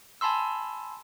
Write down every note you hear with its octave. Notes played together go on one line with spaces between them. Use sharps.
G#5 A5 B5 C6 E6